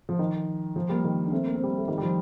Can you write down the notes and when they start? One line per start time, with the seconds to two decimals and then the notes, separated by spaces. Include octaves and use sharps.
0.09 F3
0.19 D#3
0.76 F3
0.89 G3 A#3
1.04 D#3
1.25 D4
1.32 A3 C4
1.46 A#3
1.55 C4
1.63 G3 A#3
1.78 A3
1.88 D#3 G3
1.98 G3
2.02 F3